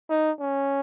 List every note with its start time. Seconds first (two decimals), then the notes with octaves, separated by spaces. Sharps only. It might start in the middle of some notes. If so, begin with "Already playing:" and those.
0.10 D#4
0.40 C#4